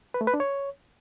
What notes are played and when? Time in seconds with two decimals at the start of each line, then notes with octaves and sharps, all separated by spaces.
0.14 B4
0.21 A3
0.27 B4
0.34 D4
0.40 C#5